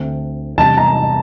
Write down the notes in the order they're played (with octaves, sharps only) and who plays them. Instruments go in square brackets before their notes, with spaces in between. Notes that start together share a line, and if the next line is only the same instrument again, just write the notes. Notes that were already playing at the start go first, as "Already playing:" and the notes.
Already playing: [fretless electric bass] D2 D3 A3 C4
[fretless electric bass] E2 C3 G3 D4 [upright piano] A5
[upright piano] A#5